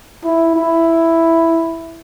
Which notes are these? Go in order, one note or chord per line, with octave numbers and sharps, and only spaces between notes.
E4
E4